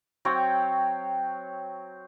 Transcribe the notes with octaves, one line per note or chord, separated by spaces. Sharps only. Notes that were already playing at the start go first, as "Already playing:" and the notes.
F#3 C4 C#5 G5